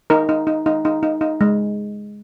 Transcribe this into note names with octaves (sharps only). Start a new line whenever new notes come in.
D#4 A#4
D#4
D#4
D#4
D#4
D#4
D#4
G#3